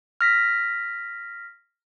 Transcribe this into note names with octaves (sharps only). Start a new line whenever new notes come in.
F6 A#6 B6